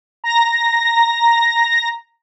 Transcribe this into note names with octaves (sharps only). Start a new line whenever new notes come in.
A#5 A#6